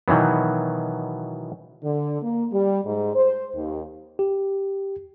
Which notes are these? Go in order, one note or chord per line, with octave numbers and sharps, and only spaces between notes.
B2 D#3 E3 F#3 B3
D3
A#3
G3
G#2
C5
D#2
G4